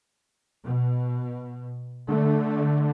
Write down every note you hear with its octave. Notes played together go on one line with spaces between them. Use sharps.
B2
D3 A3